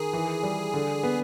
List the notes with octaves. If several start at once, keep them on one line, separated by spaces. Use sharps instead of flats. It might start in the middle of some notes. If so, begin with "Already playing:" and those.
Already playing: D#3 G#4
E3
G3
D3
B3